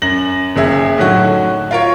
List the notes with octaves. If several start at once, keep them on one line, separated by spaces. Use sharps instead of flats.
F#2 A#6 F#7
F#1 C#3 G#4 E5
A2 D3 F#3 D#4 F#4
F4 A#4 C#5